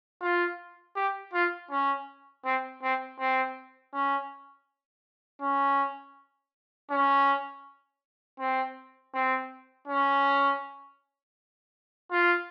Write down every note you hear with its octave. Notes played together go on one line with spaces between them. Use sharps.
F4
G4
F4
C#4
C4
C4
C4
C#4
C#4
C#4
C4
C4
C#4
F4